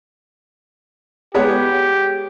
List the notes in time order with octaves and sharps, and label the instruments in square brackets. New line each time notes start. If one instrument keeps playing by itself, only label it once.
[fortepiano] G#3 B3 C#5 [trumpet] G4